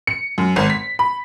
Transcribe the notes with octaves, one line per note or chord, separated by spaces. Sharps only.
C#7
F#2
G#1
B6
B5